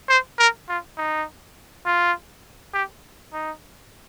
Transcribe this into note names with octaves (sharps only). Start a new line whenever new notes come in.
C5
A#4
F4
D#4
F4
G4
D#4